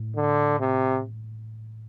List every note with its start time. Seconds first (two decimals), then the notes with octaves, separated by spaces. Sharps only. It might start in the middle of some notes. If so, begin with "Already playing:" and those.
Already playing: A2
0.16 D3
0.60 C3